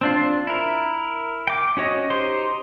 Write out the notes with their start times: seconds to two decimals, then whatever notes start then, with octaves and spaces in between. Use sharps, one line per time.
0.01 C4 D4 F4
0.47 E4 A#4
1.47 G5 D6
1.77 C#4 F#4 C#5 D#5
2.10 D#4 G4 C5 C6